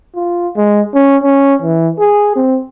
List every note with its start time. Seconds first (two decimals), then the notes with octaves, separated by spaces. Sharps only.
0.16 F4
0.57 G#3
0.95 C#4
1.24 C#4
1.62 E3
1.99 G#4
2.36 C4